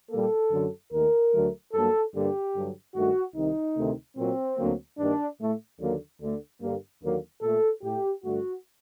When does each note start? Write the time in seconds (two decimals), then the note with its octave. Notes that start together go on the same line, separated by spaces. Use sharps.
0.11 A#2 G3 A#3 A4
0.51 F#2 D3 F#3
0.92 D#2 D#3 A3 A#4
1.32 D2 D3 F#3 A3
1.73 G2 F#3 A#3 A4
2.14 G2 D3 G3 A#3 G4
2.55 G2 D3 F#3
2.95 G2 D#3 A3 F#4
3.35 C2 C3 D#3 D#4
3.76 D2 C3 D#3 A3
4.17 A#2 F#3 A#3 C4
4.57 D2 D3 F#3 A#3
4.98 G2 D#3 G3 A#3 D4
5.39 A2 A3
5.79 D#2 D3 F#3 A#3
6.19 D2 D3 A3
6.60 G2 D3 G3 A#3
7.01 D#2 D3 F#3 A#3
7.42 A#2 A3 A4
7.82 A2 A3 G4
8.23 G2 D3 A3 F#4